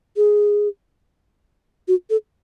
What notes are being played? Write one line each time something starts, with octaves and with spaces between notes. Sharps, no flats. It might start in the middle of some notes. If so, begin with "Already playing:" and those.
G#4
F#4
A4